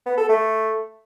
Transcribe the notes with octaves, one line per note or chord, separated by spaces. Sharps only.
B3
A4
A3